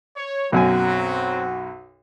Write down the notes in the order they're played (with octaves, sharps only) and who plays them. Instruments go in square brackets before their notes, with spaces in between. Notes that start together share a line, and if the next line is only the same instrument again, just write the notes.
[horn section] C#5
[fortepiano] B1 F#2 G#5 [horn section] F#3 C4 [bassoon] F#4